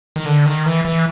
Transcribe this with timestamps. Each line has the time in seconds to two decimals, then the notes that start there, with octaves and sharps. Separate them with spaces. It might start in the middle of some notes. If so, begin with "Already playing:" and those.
0.16 D#3
0.25 D3
0.46 D#3
0.66 E3
0.85 E3